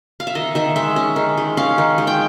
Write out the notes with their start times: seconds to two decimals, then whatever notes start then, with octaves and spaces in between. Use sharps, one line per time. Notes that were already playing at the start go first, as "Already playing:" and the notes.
0.20 F5
0.27 E5
0.35 D#3 D#5
0.55 D#3 E5
0.76 G#3 E5
0.96 C#4
1.16 D#3
1.37 G#3
1.57 C#4 F5
1.78 D#3
1.98 G#3
2.07 G5